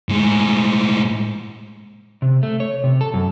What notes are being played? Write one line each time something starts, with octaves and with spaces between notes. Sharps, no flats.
A2 G#3
C3
A3
C#5
C3
A4
F#2